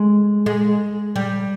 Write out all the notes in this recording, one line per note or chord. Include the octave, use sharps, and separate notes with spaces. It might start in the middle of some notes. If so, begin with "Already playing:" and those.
Already playing: G#3
G#3
G3